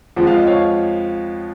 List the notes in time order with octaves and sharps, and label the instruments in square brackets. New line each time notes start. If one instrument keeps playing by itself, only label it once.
[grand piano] F2 F3 G#3 F#5
F5
D#5
C#5 F5